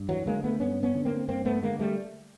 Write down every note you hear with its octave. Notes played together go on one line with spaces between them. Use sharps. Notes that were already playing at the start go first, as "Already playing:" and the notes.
Already playing: G2
E3 F#3
D3 G#3 A#3
A3 B3
G2 B3 C#4
B3 C#4
D3
A#3 C4
G2 A#3 C4
A3 B3
D3 G#3 A#3
G3 A3